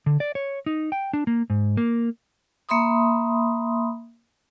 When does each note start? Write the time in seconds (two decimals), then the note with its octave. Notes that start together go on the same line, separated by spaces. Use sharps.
0.06 D3
0.20 D5
0.35 C#5
0.66 D#4
0.92 G5
1.13 D4
1.27 A#3
1.50 G#2
1.77 A#3
2.69 A#3 E5 B5 C6 D#6